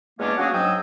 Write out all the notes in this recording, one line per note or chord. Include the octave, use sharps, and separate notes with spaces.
E2 G#3 A#3 B3 C#4 D4
F#3 A#3 C#4 D4 F#4 G#4
G#2 F#3 G5 D#6 E6